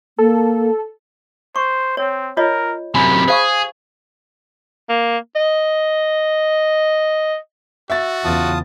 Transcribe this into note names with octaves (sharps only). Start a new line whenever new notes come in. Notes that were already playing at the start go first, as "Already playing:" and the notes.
A#3 A4
C5 C#6
C4 C#5
F4 A#4 C#5 D#5
F#2 C3 G#5 B5
G#4 C5 F5 C#6
A#3
D#5
F#4 E5 A6
E2 C#3 F4 A5 D#6